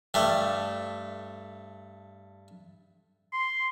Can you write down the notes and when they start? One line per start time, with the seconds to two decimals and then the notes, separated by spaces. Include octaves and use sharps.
0.14 G2 A3
3.33 C6